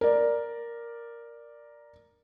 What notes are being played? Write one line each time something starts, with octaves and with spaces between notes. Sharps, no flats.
A#4 D5